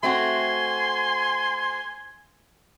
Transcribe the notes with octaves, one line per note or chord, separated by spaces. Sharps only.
A3 C4 F#4 G#5 C6